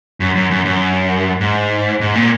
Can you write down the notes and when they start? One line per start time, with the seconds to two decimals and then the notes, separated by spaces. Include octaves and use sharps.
0.20 F#2
0.35 F#2
0.51 F#2
0.65 F#2
1.40 G#2
2.01 G#2
2.15 A#2